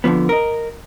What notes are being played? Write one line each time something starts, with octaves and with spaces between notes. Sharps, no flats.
F2 D3 F3 B3
A#4 D#5